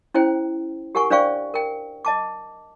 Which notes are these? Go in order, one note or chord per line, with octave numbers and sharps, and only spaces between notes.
C#4 E4 C5 G5
G4 A#4 F#5 G#5 C#6
D4 C5 D5 F5 G5 C#6
A#4 G5
D#5 A5 D6